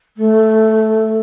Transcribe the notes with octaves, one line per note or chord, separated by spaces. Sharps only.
A3